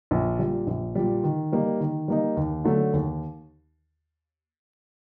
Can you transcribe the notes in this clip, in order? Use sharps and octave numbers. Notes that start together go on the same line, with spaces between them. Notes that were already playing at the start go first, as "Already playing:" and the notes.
A#1
A#2 G3
A#1
A#2 G3
D#3
G3 A#3 D#4
D#3
G3 A#3 D#4
D#2
D3 F#3 A3 D4
D#2